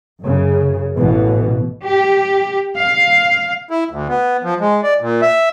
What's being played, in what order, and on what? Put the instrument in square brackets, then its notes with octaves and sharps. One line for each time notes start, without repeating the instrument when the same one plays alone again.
[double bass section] F#2 C#3
A1 B2 E3
[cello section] G4
F5
[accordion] E4
D2
B3
F3
G#3
D5
A#2
E5